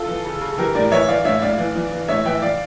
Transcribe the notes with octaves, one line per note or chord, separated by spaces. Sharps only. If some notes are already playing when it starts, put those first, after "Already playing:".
Already playing: F4 A4
E3
C#3
C#3
E3 G4 A#4
A2 A#4 D5
E3 C#5 E5
E3 D5 F5
A2 C#5 E5
A2 D5 F5
E3
E3
E3
A2 C#5 E5
E3 E5 G5
E3 D5 F5